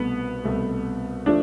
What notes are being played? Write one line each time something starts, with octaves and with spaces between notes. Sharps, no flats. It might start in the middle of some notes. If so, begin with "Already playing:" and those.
Already playing: C2 B2 A3 B3
C2 B2 A3
F3 A3 D4